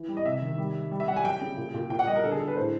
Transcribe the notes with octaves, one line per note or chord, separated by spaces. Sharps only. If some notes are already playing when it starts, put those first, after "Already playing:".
Already playing: E3
G3
D#5
C3 E5
D#3
G3
G3
G3
E5
G3 F#5
G#5
F#3 G5
C#3
A#2
A#2
A#2 G5
F#5
G3 D#5
A#4
D3 A4
G#4
D3 A4
B4
A2 C5